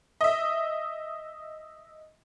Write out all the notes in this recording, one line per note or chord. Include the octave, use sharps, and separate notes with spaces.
D#5 E5